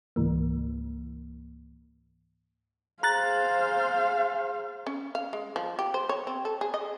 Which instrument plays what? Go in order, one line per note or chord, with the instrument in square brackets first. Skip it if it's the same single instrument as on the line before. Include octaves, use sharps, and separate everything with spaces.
[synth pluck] C#2 G#2 E3 A#3
[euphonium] G#4 [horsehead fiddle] C5 F5 [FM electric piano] A#5 F#6 A6
[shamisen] C#4
F5
G#3
F3
G4
C5
C#5
C4
A4
G#4
D#5